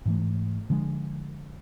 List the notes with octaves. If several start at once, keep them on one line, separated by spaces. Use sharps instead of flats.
G#2 E3 A3
D3 F3 G#3 D4